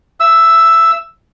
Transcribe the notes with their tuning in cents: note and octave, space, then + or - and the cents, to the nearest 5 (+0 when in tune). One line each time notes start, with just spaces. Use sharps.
E5 +25 E6 +0